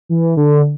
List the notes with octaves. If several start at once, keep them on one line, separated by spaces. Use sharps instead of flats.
E3
D3